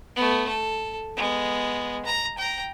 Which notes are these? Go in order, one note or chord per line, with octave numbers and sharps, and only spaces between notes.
A3 B3
A4
G#3 B3
A#5
G5 A#5